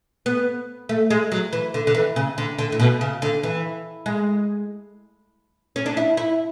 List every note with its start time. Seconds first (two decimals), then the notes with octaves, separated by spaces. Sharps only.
0.26 B3
0.89 A3
1.10 G#3
1.32 F#3
1.53 E3
1.74 D3
1.87 D3
1.95 E3
2.16 C#3
2.38 D3
2.58 D3
2.72 A2
2.80 B2
3.01 C#3
3.22 D3
3.43 E3
4.06 G#3
5.76 C#4
5.86 D4
5.97 E4
6.17 E4